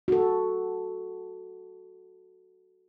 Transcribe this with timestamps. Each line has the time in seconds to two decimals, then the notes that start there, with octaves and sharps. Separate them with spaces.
0.08 F#4 A4